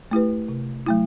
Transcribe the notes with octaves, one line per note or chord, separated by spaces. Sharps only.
A3 E4 G4 B4
C3
F#3 A3 E4